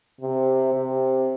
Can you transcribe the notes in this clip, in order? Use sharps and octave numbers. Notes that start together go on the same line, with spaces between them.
C3
C3